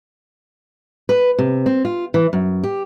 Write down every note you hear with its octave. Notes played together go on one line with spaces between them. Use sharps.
B4
C3
C4
F4
E3
F#2
G4